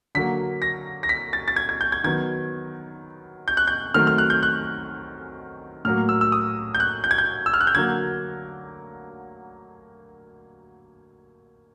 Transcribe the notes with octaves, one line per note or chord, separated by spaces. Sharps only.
D3 F#3 A#3 B6
A#6
A#6
B6
A6
A6
G#6
G#6
G6
G#6
D#3 F#3 B3 G#6
G6
F#6
G6
D#3 F#3 A3 C4 F6
F6
F#6
G6
F#6
A2 F#3 A#3 F6
E6
E6
D#6
G6
F#6
G6
G#6
G6
E6
F6
F#6
G6
D3 F#3 A#3 G#6